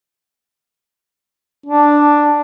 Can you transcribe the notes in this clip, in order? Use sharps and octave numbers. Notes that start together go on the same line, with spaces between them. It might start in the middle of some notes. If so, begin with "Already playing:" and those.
D4